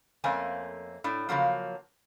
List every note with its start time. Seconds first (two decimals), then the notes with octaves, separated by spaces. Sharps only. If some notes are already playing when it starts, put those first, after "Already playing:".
0.24 F2 A3 A#3 C4 C#4 G#5
1.04 A2 D4
1.29 C#3 F3 F#3 A#3